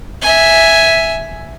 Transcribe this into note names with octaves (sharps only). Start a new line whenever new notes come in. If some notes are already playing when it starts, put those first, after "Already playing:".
E5 G#5